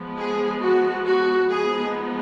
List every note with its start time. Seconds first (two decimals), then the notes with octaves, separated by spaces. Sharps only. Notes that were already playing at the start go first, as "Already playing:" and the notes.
Already playing: F3 G#3 B3
0.17 G#4
0.61 F#4
1.05 F#4
1.49 F3 G#3 B3 D#4 G#4